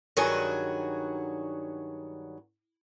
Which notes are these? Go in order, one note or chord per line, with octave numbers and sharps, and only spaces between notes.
G2 D#3 F#3 F#4 G#4 G#5